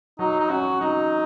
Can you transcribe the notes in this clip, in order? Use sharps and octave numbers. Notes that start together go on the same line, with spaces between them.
F#3 D#4
D#4
C#4 F#4
F#3 D#4